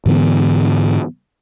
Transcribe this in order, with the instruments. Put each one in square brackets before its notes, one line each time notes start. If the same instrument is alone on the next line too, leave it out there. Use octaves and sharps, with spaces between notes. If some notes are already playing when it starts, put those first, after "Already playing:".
[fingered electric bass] G#2 D3 E3 B3